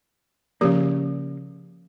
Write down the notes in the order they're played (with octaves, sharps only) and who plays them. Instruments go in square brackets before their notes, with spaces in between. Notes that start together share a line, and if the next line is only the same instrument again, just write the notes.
[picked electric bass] C#3 A#3 [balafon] F3 G4